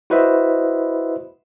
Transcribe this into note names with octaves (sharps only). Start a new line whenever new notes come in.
E4 F#4 B4 C5 D#5 E5